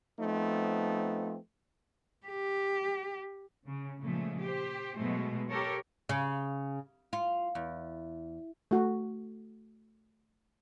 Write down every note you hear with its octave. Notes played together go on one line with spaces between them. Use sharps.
F3 A3 B3 C4 D#4
G4
C#3
A#2 C#3 F3 G#3 A3
G4 C5
B2 F#3 G#3 A3
G4 A4 A#4 C#5
C#3
F4
E2
A3 F#4